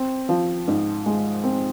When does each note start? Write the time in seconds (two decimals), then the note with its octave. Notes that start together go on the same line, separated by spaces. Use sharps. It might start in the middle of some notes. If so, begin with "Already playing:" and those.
Already playing: C4
0.29 F3
0.68 G#2
1.06 G#3
1.44 C4